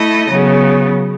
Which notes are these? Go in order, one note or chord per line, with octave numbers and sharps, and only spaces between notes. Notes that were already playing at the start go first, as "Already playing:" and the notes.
Already playing: A3 E4 A4 D#5
C#3 F#3 B3